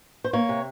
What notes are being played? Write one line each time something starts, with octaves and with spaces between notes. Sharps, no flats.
C5
A#3 C#5
C3